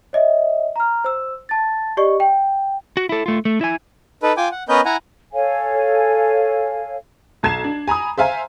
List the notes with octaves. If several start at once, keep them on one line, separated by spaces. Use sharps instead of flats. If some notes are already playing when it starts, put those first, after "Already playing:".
C#5 D#5 E5
A#5 F6
C5 E6
A5 A6
G4 D5 D#5 C#6
G5
F#4
E4 A4
A3 F4
A3
E4 G#5
D#4 A4 B4
F4 G5 G#5 D6
F#5
B3 C#4 A#4 B4 D#5 G6
E4 F#5 G#5 A#5
A4 C#5 F5 G#5
B1 A5 G#6 C7 E7
D4
G#5 A#5 B5 D#6
C5 E5 F5 G#5 A#5